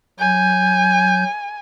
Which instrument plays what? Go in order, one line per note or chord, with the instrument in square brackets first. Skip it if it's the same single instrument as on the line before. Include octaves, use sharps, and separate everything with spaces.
[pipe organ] F#3 G6 [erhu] G#5